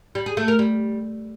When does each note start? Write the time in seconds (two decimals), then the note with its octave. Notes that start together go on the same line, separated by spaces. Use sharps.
0.15 G3
0.26 G#4
0.37 A3
0.48 A#4
0.59 G3